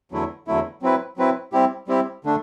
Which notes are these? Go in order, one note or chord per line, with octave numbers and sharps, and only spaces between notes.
E2 D3 F#3 A3 E4
E2 D3 F#3 A3 E4
F#3 C4 E4 B4
F#3 C4 E4 B4
G3 C4 E4 G4
G3 C4 E4 G4
D3 A3 D4